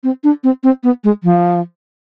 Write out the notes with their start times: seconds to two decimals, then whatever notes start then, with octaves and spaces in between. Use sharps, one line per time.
0.04 C4
0.24 D4
0.44 C4
0.63 C4
0.84 B3
1.04 G#3
1.24 F3